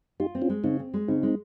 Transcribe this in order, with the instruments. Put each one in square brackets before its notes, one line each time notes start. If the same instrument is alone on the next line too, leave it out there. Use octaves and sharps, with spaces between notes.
[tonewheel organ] D#4 G4 [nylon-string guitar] F4
[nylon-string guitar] C4
[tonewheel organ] C#4 F4
[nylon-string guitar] G#3
[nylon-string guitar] C#3 [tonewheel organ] C4 D#4
[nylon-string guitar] C4
G#3
[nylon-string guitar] C#3 [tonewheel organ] C4 D#4
[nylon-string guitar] G#3